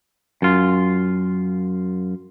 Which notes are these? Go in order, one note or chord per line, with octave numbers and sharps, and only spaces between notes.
F#2 F4